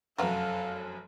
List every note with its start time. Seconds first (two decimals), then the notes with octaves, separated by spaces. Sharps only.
0.18 F1 F#2 F#3 A4 B4 E5 F5